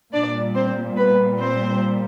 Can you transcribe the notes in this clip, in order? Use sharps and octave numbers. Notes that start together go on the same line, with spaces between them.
A#2 G3 D4 D5
C4 C5
B3 B4
C4 C5